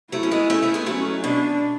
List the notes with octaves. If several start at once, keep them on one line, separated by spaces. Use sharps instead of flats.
F#3 A3 E4
C#4
G#3 B3
A3 C#4
A3 C#4
G#3 B3
F#3 A3 C#4
B2 D4